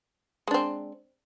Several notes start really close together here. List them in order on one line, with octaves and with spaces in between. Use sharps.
G#3 D4 C4